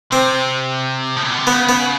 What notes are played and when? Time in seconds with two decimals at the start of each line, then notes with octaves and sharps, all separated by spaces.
0.12 C3 C4
1.16 A2
1.24 A#2
1.32 B2
1.39 C3
1.47 C#3 B3
1.69 B3